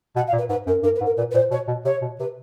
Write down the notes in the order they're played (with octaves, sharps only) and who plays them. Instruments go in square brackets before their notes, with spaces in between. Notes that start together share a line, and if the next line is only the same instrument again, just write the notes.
[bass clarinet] B2 [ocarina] F#5
[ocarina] F5
[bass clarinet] A#2
[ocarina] B4
[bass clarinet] G#2 [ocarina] B4
[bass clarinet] F#2 [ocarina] A#4
[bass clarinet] G2 [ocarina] A#4
[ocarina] B4
[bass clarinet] G#2
[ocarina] A#4
[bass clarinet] A#2 [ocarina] B4
[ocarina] B4
[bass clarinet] A#2 [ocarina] C5
[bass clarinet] B2 [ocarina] C#5
[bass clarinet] B2
[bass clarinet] C3 [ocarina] C#5
[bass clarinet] B2
[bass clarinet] C3 [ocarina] B4